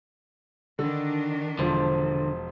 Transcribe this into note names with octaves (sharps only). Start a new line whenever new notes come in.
D3 D#3 D4
E1 D3 F3 C5 A5 D6